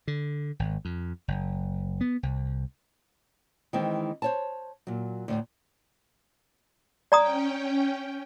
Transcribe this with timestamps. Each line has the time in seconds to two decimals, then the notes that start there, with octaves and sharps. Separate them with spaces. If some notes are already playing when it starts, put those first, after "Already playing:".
0.08 D3
0.59 G#1
0.85 F2
1.28 F#1
2.01 B3
2.23 C2
3.73 D#3 E3 G#3 C4
4.22 C5 C#5 A5
4.87 A#2 F#3
5.28 D2 A2
7.12 C#4 D5 G5 A#5 D#6